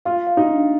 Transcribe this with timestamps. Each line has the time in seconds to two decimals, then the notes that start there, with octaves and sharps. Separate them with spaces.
0.05 F4 F5
0.27 F5
0.37 D#4
0.48 D4